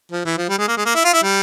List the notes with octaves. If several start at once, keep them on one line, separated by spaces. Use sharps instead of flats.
F3
E3
F3
G3
G#3
A#3
G#3
A#3
E4
F4
E4
G3